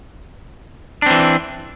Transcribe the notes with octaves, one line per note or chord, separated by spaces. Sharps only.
E3 C4 D4